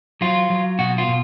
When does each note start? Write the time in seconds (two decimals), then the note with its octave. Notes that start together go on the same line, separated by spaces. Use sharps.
0.21 F#3 F4
0.50 F#3
0.79 B2 F#4
0.98 F4
1.08 B2